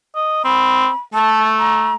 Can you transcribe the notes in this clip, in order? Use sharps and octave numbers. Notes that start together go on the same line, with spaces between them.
D#5
C4 B5
A3 A5
A#5